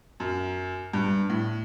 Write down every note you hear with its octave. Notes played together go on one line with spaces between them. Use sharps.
F#2
G2
A2